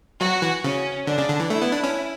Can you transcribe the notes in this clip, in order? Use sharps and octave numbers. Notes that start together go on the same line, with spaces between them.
F#3 F#4
E3
C#3 C#4
D3 D4
C#3
D3
E3
A3 E4
B3
D4
C#4